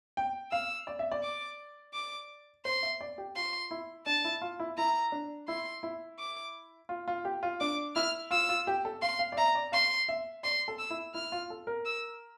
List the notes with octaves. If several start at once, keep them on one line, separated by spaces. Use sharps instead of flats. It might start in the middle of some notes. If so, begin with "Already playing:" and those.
G5
F5 E6
D5
E5
D5
D6
D6
C5 C6
E5
D5
G4
F4 C6
E4
D4 A5
E4
F4
E4
E4 A#5
D4
E4 C6
E4
D6
F4
F4
G4
F4
D4 D6
E4 F6
F4 E6
F4
G4
A4
F5 C6
F5
D5
E5 A#5
D5
F5 C6
E5
D5 C6
A4
E6
E4
E4 F6
F4
A4
A#4
E6